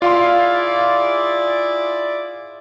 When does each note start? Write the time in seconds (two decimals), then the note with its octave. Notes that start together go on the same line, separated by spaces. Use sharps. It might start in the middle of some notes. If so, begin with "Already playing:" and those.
0.02 E4 F4 G#4 D5 F5 C6